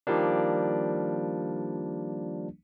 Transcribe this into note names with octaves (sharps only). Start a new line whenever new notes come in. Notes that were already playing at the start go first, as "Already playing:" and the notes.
D#3 F3 G3 A#3 D4